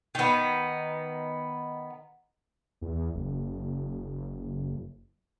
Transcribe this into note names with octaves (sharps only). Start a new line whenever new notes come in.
D#3 B3
E2
F#1